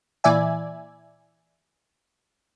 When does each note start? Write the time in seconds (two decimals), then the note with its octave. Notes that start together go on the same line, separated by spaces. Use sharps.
0.24 A#2 E3 D5 E5 G#5